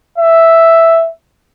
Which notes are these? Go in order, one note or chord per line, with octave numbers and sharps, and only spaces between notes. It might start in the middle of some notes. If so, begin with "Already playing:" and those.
E5